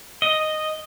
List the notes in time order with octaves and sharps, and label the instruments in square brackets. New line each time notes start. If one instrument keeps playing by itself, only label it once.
[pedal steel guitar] D#5